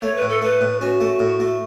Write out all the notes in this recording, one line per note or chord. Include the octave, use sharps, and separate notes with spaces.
A3 C#5
B4
A2
A4
A3 B4
A2
C#4 F#4
A3
A2
A3